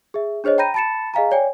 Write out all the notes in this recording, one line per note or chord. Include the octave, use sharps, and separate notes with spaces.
G#4 E5
D4 G#4 C5 C#5 D#5
G5 A#5 B5 G6 A#6 D#7
A5 B5 A6 C#7 E7
G#4 D#5 F5 G#5 A#5
C#5 D5 G5 G#5